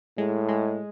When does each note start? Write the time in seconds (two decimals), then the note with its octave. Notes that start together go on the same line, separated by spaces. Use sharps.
0.18 A2 G#3
0.49 G#3